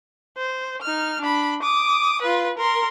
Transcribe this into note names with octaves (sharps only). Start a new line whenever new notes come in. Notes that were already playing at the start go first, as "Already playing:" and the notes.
C5
D#4 F6
D4 B5
D6 D#6
F4 B4
A#4 C6